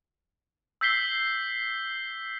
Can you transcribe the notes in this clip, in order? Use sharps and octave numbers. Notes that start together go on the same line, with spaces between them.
E6 G6 B6 C7 G7